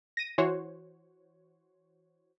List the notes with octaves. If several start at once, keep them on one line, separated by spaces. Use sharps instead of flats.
A#6 D#7
E3 F#4 C5 C#5